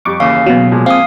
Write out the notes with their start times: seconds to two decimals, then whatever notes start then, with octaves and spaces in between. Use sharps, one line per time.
0.05 F2 G3 C#6 D6
0.20 D#2 C#3 E3 F5
0.46 B2 F#3
0.71 A#2 F3 G#3
0.86 C4 F5 D#6